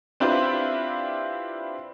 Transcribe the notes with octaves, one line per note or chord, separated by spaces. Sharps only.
C4 D4 E4 F4 G4 B4